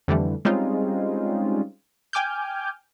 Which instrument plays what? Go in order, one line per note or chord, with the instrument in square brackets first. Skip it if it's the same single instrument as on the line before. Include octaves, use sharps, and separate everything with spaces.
[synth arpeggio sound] F2 D3 E3 G3 A3
G3 G#3 C4 C#4 D#4 F4
G5 G#5 D6 F6 G6